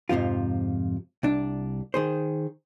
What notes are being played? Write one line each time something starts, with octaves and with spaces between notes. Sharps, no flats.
F2 G#2 C3 F3 F4
C2 D4
D#3 G#4 C5